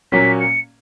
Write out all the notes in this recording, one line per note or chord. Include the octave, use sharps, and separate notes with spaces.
A#2 F#3 A#3 C#4 B6
C#7